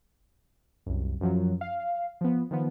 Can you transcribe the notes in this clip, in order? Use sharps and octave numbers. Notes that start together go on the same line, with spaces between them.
C2 F#2
F#2 F3 F#3
F5
F3 B3
D#3 F3 B3